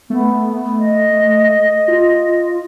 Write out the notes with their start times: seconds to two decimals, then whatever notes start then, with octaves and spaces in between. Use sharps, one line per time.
0.10 A3 B3
0.79 D#5
1.88 F4